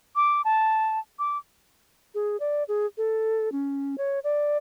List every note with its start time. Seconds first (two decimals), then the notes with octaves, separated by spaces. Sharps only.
0.16 D6
0.45 A5
1.19 D6
2.14 G#4
2.40 D5
2.68 G#4
2.97 A4
3.52 C#4
3.98 C#5
4.24 D5